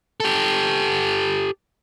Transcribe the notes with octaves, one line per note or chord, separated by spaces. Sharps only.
G4 A4